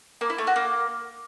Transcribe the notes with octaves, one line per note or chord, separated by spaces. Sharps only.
A#3
E4
A3
F#4
A#3